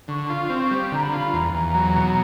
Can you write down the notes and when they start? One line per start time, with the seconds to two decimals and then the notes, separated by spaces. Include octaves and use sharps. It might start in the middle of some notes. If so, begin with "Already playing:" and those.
0.08 D3 C#6
0.30 F4
0.40 C#6
0.50 C4
0.71 G3
0.92 D3 A#5
1.02 B5
1.13 F4
1.33 E2 A#5
1.54 E2
1.74 F#3
1.95 B2